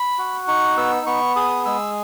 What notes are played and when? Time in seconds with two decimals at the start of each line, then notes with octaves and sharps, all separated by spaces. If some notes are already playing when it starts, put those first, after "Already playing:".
Already playing: B5
0.19 F#4
0.48 D#4 C#6
0.77 B3 E6
1.06 B3 C#6
1.36 G#4 D#6
1.65 G#3 E6